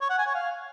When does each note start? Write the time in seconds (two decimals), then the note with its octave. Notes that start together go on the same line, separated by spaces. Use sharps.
0.01 C#5
0.10 F#5
0.18 G#5
0.26 C#5
0.35 F5